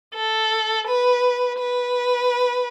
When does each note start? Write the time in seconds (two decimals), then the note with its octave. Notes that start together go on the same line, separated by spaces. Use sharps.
0.14 A4
0.87 B4
1.59 B4